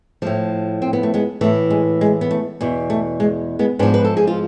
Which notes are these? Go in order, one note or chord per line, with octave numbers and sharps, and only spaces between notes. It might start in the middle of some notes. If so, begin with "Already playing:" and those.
A2 F3 A3
C4
B3
A3
G#3 B3
A2 E3 A3
G#3
G#3
B3
A3
E2 B2
A3
G#3
G#3 B3
G#2 F3 B3 D4
B4
A4
G#4
F4